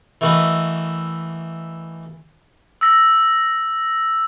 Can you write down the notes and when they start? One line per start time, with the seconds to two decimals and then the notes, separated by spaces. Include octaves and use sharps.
0.21 E3 A3 A#3 F#4 B4 D#5
2.81 E6 A#6